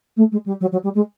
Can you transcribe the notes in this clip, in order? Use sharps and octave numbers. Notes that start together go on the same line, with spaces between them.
A3
G#3
G3
F#3
F#3
G3
G#3